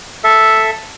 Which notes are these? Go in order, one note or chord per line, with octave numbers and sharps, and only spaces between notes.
A4 E5